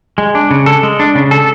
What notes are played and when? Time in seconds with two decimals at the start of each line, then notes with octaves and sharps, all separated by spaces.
0.18 G#3
0.35 D4
0.51 C#3
0.66 A4
0.83 G#3
1.00 D4
1.15 C#3
1.31 A4